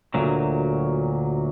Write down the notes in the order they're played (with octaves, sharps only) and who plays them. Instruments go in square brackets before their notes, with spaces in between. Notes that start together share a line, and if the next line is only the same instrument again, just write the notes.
[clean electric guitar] D2 A#2 F#3